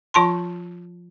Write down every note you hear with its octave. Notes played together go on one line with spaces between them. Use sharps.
F3 F4 A5 C6